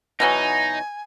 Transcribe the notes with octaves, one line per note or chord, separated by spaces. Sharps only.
B2 E3 F#3 D#4 G#5